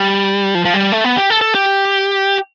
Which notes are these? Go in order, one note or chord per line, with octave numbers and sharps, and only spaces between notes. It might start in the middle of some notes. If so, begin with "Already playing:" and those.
Already playing: G3
F3
F3
G3
A3
B3
G4
A4
A4
G4